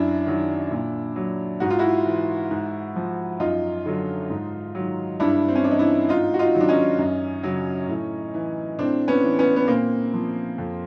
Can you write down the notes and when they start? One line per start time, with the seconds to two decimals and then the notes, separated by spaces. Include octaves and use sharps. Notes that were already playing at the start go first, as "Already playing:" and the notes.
Already playing: F#2 D4 E4
0.27 D#3 F#3
0.71 A#2
1.16 F#3
1.60 G#2 F#4
1.70 F4
1.79 E4 F#4
2.06 E3
2.51 G#2
2.96 F3
3.40 F#2 D#4 F4
3.86 D3 F#3
4.30 G#2
4.75 D#3 F#3
5.20 G2 D4 E4
5.48 C4
5.56 C#4
5.64 E3 D4
5.71 D#4
5.79 D4 E4
6.09 G#2 D#4 F4
6.34 F#4
6.39 D#4 F4
6.55 D#3 F#3
6.61 D4
6.69 C#4 D#4
6.98 F#2
7.43 C#3 F#3
7.88 A2
8.34 E3
8.78 A2 C4 D4
9.08 B3 C#4
9.24 E3
9.39 B3 C#4
9.56 B3
9.68 A#2 A#3 C4
10.14 F3
10.58 F2